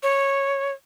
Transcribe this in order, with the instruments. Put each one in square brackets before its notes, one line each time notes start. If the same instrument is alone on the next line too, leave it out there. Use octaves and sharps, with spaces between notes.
[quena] C#5